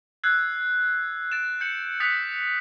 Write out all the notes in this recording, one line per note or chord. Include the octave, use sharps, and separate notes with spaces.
E6 F#6 G#6 C7
A6 D7 E7
G6 C#7 F#7
D#6 F#6 A6 B6 C#7 F7